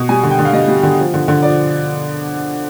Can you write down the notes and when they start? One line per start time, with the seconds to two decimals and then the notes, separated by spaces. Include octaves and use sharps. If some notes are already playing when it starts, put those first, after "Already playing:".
Already playing: B2
0.09 G3 G#5
0.23 D3
0.31 G5
0.39 D3
0.45 F5
0.53 G3 D#5
0.68 G3
0.83 D3
0.99 F3
1.14 D3
1.28 D3
1.42 F3 D5